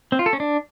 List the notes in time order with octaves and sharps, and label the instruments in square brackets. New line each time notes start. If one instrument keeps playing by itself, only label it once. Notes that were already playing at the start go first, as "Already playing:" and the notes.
[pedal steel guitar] C4
F4
A4
C#4
D4